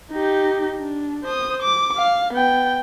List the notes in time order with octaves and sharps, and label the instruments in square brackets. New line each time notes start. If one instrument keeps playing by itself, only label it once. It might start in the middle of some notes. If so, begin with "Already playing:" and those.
[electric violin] D#4 G4
D4
C5 D#6
D6
F5
B3 G5